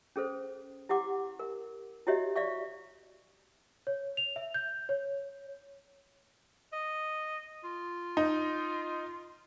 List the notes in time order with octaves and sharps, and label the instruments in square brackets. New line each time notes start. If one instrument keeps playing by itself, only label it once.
[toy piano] C#4 G#4 A4 C5
E4 G4 F#5 D6
A#4
E4 F#4 G4 C#5 D#5 E5
D5 E5 F5 C#6
[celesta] C#5
F7
E5
G6
C#5
[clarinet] D#5
F4
[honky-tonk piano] D#4